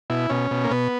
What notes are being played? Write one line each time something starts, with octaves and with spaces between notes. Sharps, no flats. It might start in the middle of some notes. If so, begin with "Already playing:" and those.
B2 E4
B2 C#4
B2
A#3
B2 B3